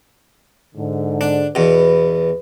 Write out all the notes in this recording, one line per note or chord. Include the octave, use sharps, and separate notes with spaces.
G#2 D3
D4
E2 B2 B4